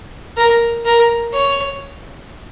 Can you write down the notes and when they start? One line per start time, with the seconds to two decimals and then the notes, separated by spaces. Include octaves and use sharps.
0.37 A#4
0.85 A#4
1.33 C#5